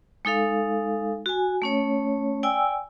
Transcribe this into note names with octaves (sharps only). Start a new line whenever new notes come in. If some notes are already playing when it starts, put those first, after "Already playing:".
G#3 D#4 A4 F5
F#4 G#5
A3 C#4 C#5
D5 G5 G#5 E6